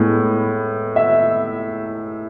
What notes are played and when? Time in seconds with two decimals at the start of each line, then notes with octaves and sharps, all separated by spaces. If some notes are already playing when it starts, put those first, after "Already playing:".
Already playing: A2 G#3 B3
0.96 E5